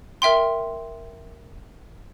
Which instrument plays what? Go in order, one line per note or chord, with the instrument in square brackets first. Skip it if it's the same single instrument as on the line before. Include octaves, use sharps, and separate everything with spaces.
[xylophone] A#4 E5 G5 C6